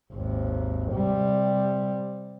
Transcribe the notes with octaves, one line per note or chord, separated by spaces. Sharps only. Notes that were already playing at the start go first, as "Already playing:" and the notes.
G#1 D#2
C3 G3